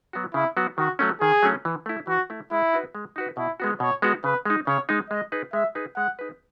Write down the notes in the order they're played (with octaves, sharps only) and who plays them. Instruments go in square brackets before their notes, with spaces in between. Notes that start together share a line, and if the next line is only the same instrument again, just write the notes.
[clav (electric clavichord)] F#3 B3 F#4
[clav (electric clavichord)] C#3 [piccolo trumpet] E4
[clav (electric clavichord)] F#3 B3 F#4
[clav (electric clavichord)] D#3 [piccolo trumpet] F#4
[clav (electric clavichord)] F#3 A3 C#4
[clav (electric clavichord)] D#3 [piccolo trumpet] G#4
[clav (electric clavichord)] F#3 A3 C#4
E3
A3 E4
[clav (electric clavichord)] E3 [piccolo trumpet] F#4
[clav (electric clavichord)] A3 E4
[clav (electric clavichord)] G#3 [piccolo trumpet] E4
[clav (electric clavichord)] D#4 F#4 B4
G#3
D#4 F#4 B4
[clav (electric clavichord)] B2 [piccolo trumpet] E4
[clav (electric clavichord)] G#3 B3 F#4
[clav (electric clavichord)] B2 [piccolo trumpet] C#5
[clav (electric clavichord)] G#3 B3 F#4
[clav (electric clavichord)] C#3 [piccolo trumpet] B4
[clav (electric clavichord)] G#3 D#4
[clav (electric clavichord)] C#3 [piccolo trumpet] C#5
[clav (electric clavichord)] G#3 D#4
[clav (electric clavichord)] G#3 [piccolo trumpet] D#5
[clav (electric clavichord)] D#4 G#4 B4
[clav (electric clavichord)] G#3 [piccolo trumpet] E5
[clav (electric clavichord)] D#4 G#4 B4
[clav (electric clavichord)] G#3 [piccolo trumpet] F#5
[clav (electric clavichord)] D#4 G#4 B4